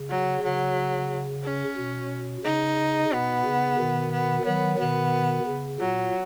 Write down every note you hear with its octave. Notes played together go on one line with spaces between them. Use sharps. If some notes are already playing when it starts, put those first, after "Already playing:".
Already playing: C#3
F#3
C#3 F#3
C#4
B2
C#3 D#4
B2 B3
C#3
B2 D#3
B3
D#3 F#3 B3
B2 D#3 B3
C#3
A#2 F#3